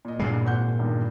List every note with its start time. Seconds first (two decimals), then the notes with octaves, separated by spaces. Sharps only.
0.05 A#2 D#5
0.19 G2 A#2 G#3 B3 C7
0.45 G#1 F#5 G6
0.79 E2 G2 D#3